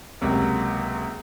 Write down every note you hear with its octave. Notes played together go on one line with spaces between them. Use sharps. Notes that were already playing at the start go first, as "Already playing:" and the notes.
C#2 C3 F#3 A#3